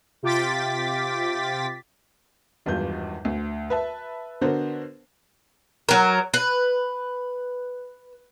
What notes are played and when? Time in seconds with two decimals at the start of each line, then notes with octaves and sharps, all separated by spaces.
0.23 C3 F4 G5 D6 A6 B6
2.66 G#1 E2 G2 F#3 F4 G6
3.25 D2
3.70 B4 E5 A5
4.41 D3 B3 D4 F#4 A#4 C5
5.89 F#3 A#4
6.34 B4